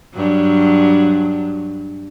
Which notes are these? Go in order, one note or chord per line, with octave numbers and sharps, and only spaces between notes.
G2 F#3